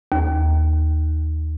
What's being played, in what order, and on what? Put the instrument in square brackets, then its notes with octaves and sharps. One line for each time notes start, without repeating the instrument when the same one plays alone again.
[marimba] D#2